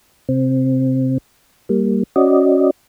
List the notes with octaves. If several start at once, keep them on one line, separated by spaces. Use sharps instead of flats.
C3 C4
G3 A#3
C#4 F#4 D5 D#5